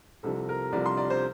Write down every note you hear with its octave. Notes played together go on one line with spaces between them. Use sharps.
C2 C3 F3 A4
A#4
C2 C3 F3 D5
C6
D5
C5